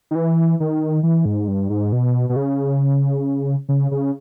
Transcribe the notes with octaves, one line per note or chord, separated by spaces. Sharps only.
D#3
E3
D#3
E3
G#2
G2
G#2
B2
B2
C#3
C#3
C#3